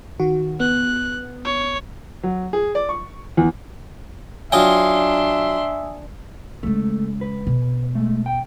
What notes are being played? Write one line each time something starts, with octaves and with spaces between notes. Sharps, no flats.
D#3 F#4
B3 F#6
C#5
F#3
G#4
D5
C#6
E2
F#3 D4 F4 E5 G5 G#5 C6 D#6
C#3 G#3 A3
B4
B2
G#3 A3
G5